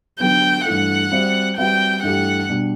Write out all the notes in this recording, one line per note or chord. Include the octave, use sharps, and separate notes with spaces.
D3 F#3 B3 G5
G2 E3 A3 F#5
G3 C4 F#4 C5 E5
G3 C4 F#4 B4 E5 G5
G2 E3 A3 E4 G4 F#5
B2 G3 D4 G4